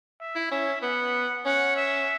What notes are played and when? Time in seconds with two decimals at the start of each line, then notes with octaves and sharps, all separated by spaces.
0.20 E5
0.35 E4
0.51 C#4 E5
0.82 B3 F#5
1.45 C#4 F#5
1.76 E5